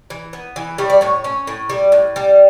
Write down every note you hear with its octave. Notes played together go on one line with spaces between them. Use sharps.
E3
B3
E3
G3 C#5
D5
A2 C#5
C#4
A2
G3
A2
G3